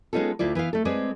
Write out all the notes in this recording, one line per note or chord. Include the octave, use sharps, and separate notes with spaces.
G#3 B3 C#4 D#4 F4 A4
D2 E4 F4 D5
E3 B3 E4 F5
A3 A4
G#3 C4 G#4 B4 D5